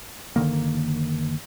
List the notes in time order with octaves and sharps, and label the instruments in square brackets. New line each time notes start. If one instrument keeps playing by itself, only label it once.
[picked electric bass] F#1 D3 D#3 A#3